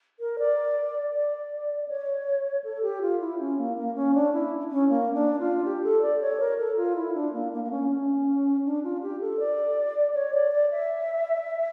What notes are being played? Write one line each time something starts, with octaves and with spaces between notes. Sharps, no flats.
A#4
D5
D5
C#5
A4
G4
F4
E4
C#4
A#3
A#3
C#4
D4
E4
C#4
A#3
D4
F4
G4
A4
D5
C#5
A#4
A4
F4
E4
D4
A#3
A#3
A#3
C#4
C#4
D4
F4
G4
A4
D5
C#5
D5
D5
E5